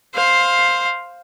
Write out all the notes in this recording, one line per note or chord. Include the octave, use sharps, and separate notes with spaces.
C5 F5